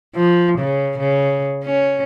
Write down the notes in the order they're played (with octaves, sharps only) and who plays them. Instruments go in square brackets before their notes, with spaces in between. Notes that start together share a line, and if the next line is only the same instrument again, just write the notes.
[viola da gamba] F3
C#3
C#3
C#4